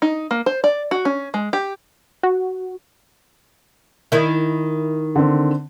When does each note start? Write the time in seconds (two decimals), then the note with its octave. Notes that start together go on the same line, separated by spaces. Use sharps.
0.02 D#4
0.31 A#3
0.46 C5
0.64 D5
0.91 F#4
1.05 C#4
1.34 G#3
1.53 G4
2.23 F#4
4.12 D#3 E4
5.16 D3 C4